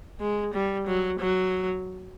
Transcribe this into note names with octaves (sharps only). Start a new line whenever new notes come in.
G#3
G3
F#3
F#3